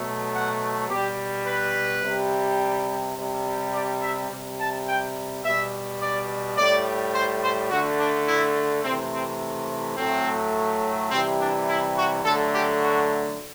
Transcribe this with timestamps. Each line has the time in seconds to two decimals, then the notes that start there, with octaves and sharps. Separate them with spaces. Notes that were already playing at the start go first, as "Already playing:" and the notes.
Already playing: B2 F#3 A3
0.33 F#5
0.89 B2 G3 G4
1.46 B4
2.03 C3 G3
3.17 C3 G3
3.73 D5
4.02 E5
4.30 C3 G3
4.58 A5
4.87 G5
5.43 B2 G3 E5
6.00 D5
6.57 A2 G3 D5
7.14 C5
7.42 C5
7.70 D3 A3 F#4
7.99 D4
8.27 E4
8.84 C3 E3 A3 C4
9.12 C4
9.97 A2 F#3 A3 C4
11.11 C3 E3 G3 C4
11.39 D4
11.68 E4
11.96 F#4
12.24 D3 F#3 A3 A4
12.53 G4
12.81 F#4